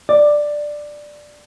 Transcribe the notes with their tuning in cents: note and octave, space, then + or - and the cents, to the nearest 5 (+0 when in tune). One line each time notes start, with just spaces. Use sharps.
D5 +10